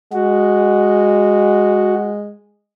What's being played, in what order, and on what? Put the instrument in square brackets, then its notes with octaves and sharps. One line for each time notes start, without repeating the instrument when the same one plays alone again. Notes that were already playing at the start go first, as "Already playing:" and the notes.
[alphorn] G#3 [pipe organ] F#4